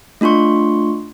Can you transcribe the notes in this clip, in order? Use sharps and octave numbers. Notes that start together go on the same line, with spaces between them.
A3 D4 F4 C6 C#6